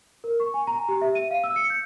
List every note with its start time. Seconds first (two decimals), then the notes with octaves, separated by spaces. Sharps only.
0.24 A#4
0.40 C#6
0.54 G#5
0.67 A#5
0.89 G4
1.02 E5
1.15 D#7
1.31 F5
1.44 E6
1.56 C#7
1.70 G6